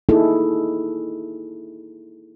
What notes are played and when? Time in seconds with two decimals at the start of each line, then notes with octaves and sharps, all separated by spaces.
0.09 A#3 D#4 E4 G#4 A4